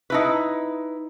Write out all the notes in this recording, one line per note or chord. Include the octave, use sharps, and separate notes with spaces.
D#4 E4 B4